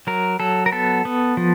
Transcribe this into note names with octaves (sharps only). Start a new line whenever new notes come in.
F#3 A#4
F#3 A4
A#4
B3 A4
B3
F3